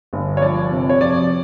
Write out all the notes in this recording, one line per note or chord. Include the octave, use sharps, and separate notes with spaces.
G1
C#5
F3 D5
C3
C#5
F2 D5